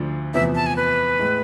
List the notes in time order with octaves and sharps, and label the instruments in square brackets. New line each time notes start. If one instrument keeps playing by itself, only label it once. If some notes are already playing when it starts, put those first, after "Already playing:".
Already playing: [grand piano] D2 D3 F3
[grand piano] E2 C3 F3 B3 [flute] E5
[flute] A5
G#5
B4
[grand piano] A2 G#3